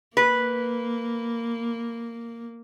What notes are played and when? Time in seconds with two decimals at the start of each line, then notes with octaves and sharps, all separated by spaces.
0.17 A#3 B4